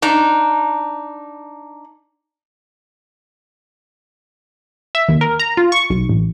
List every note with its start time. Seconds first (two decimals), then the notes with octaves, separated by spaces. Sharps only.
0.02 D4 D#4
4.95 E5
5.08 D#2
5.21 A#4
5.40 A#5
5.57 F4
5.72 C#6
5.90 B1
6.09 A1